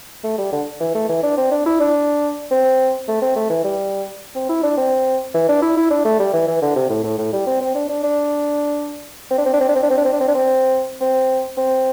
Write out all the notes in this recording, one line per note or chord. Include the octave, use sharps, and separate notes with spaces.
A3
G3
D3
E3
A3
E3
D4
C4
D4
E4
D4
C4
A3
C4
A3
E3
G3
C4
E4
D4
C4
E3
D4
E4
E4
D4
A3
G3
E3
E3
D3
C3
A2
A2
A2
G3
C4
C4
D4
D4
D4
C4
D4
C4
D4
C4
D4
C4
D4
C4
D4
C4
D4
C4
D4
C4
C4
C4